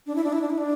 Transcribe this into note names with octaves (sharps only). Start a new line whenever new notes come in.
D4
E4
D4
E4
D4
E4
D4